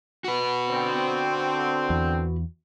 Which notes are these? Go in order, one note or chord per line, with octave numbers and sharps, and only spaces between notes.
F#4 B4
D3 C4
E2